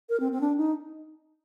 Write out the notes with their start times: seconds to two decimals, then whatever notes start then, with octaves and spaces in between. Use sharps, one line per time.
0.09 A#4
0.20 C4
0.32 C4
0.41 D4
0.57 D#4